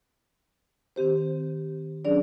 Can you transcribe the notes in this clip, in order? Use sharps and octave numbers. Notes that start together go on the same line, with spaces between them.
D#3 C4 G4 C5
F#3 C#4 D4 G#4 D5